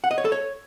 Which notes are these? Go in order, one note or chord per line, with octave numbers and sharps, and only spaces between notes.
F#5
D#5
C#5
A4
C#5